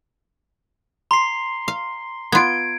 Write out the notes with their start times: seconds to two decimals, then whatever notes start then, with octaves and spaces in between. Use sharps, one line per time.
1.11 A#5 C6 C7
1.68 F5
2.32 B3 F4 G#6 D7